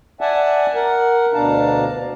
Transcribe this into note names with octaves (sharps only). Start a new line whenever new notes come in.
D5 E5 F#5 G#5 A5
A#4 F#5
D2 B2 D4 F5 A5 A#5